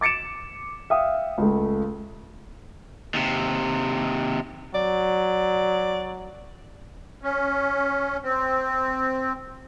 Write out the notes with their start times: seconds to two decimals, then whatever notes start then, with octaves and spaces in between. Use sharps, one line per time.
0.01 D6 A6 C#7 D7 E7
0.90 E5 F5 G5 D#6
1.38 C#2 A3
3.14 D#2 C3
4.75 F#3 D5
7.23 C#4
8.24 C4